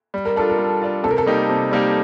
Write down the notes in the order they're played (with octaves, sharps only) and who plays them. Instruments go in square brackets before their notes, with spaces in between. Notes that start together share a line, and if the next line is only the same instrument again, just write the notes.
[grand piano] G3
[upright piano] A#4
[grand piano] D4 F4 [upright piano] A4
[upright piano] A#4
[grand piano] G3
D4 F4
[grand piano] C3 [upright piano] A4
[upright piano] A#4
A4
[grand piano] G3 A#3 D#4 G4
C3
G3 A#3 D#4 G4